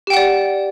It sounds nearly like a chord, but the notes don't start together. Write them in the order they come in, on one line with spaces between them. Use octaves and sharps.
G4 G5 F#5 D5